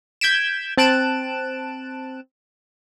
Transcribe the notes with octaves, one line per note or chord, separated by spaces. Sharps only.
G6 G#6 B6 D7 E7
C4 A5 F#6 D7 E7